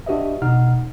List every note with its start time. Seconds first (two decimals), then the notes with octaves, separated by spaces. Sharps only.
0.06 D4 F#4 G4 B4 D#5 E5
0.42 B2 D#4 F#5 F6